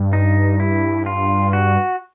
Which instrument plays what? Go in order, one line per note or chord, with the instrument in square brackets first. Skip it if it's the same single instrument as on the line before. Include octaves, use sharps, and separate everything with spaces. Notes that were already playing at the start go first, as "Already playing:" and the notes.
Already playing: [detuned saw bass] G2
[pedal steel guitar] D#4
E4
F4
F#4